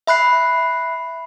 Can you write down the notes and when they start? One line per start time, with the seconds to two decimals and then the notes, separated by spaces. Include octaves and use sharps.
0.07 E5 B5 F#6 C7